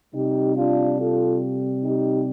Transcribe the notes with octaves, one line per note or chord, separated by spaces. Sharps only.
C3 G3 D#4 G4
D4 F4
F4 A4
D#4 G4